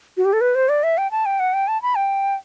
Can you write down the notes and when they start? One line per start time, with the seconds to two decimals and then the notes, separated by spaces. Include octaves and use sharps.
0.17 F#4
0.25 G4
0.33 A4
0.41 B4
0.55 C5
0.69 D5
0.83 E5
0.98 G5
1.11 A5
1.26 G5
1.40 F#5
1.54 G5
1.68 A5
1.82 B5
1.97 G5